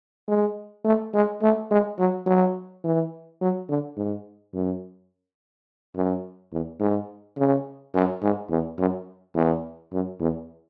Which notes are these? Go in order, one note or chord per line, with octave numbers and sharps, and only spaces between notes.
G#3
A3
G#3
A3
G#3
F#3
F#3
E3
F#3
D3
G#2
F#2
F#2
E2
G#2
C#3
F#2
G#2
E2
F#2
E2
F#2
E2